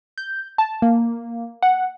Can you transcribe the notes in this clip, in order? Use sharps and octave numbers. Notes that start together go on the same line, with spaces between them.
G6
A5
A#3
F#5